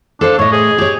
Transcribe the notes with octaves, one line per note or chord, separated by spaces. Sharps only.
D4 A4 C5 F5
A2 C#5 D#5
G#4
G4 C#5